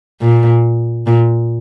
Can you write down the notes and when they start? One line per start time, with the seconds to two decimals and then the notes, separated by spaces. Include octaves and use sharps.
0.22 A#2
1.07 A#2